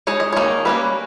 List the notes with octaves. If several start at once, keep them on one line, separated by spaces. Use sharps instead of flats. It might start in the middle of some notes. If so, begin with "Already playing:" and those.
G#3 D#4 C#5
D#5
D#3 A#3 D#4 C#5
G3 A#3 C#4 B4